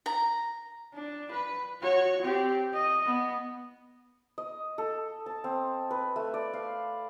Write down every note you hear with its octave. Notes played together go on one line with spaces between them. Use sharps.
A#5
D4
B4
F#4 C#5
C4 G4
D#5
B3
D#5
A4
A5
C4
B4
A3
D5
F5